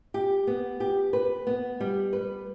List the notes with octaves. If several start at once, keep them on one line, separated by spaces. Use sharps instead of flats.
G4
B3
G4
B4
B3
G3
B4